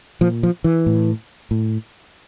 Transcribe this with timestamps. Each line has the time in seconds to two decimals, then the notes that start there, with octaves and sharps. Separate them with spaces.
0.21 A#2 F3
0.43 F3
0.64 E3
0.86 A2
1.51 A2